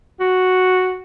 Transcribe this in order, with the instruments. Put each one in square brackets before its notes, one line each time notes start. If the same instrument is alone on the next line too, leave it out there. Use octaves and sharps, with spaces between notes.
[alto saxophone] F#4